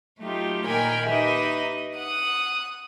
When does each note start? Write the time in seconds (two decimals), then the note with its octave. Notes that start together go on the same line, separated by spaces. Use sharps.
0.20 F#3 A3 D#4 F4 G4
0.66 A#2 D#3 A#4 G5 G#5 B5
1.08 D#4 G4 B4 D#5 E5
1.96 F#5 D#6